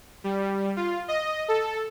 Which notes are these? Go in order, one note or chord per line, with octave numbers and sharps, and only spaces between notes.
G3
F4
D#5
A4